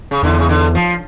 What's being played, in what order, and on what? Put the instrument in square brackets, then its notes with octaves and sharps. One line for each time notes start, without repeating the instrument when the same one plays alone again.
[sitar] C#3
[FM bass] E2 [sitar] D3
[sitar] C#3
D3
F3